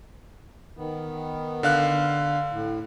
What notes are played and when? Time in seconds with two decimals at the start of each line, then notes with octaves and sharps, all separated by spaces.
0.77 D#3 B3
1.63 D3 F5 F#6
2.52 A2